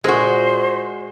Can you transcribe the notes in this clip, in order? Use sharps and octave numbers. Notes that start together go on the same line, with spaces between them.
A#2 G#3 F#4 G#4 A#4 C5